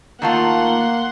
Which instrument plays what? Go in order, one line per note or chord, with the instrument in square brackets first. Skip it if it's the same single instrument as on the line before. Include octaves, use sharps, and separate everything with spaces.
[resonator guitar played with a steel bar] D#3 A3 F4 [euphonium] A#3 [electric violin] F#5 C6